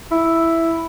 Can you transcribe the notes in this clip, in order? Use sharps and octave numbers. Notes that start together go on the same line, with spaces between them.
E4